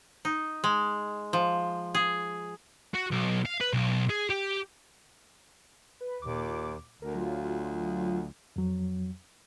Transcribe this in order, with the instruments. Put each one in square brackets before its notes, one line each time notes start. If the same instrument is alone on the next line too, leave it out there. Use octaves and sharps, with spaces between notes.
[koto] D#4
G#3
F3
G#4
[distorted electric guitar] F#4
B1
F5
B4
B1
G#4
G4
[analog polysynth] B4
[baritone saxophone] D#2 [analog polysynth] A#2 D6
[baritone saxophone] D2 [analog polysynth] A#4
[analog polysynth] F#3 F4
[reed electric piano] F2 F#3